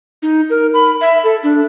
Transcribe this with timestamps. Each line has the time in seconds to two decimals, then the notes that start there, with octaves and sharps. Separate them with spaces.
0.23 D#4
0.50 A#4
0.74 B5
1.01 E5
1.24 A4
1.43 D4